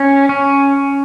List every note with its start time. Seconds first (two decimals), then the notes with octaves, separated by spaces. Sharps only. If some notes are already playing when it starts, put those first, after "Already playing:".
Already playing: C#4
0.29 C#4